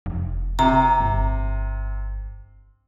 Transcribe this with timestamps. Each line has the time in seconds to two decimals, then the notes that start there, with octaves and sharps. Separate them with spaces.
0.06 F1
0.59 C3 A#5
1.00 G1